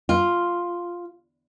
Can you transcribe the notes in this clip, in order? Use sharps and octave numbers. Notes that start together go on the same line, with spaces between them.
F4